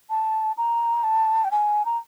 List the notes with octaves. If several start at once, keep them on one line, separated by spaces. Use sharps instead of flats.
A5
A#5
A5
G5
G#5
A#5